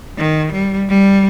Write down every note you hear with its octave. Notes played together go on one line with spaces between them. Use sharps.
D#3
G3
G3